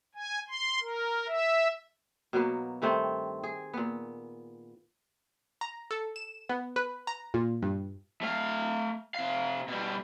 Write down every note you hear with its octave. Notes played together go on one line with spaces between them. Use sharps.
G#5
C6
A#4
E5
B2 F#3 A#3 B3
G2 D#3 A3 C4
G#4
A#2 B3
A#5
A4
E7
B3
B4
A#5
A#2
G2
A3 F5
C3 F5
B2 G3